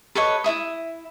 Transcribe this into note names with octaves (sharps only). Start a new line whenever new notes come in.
A4 B4 C#5 D#5
E4 D5 E5 D#6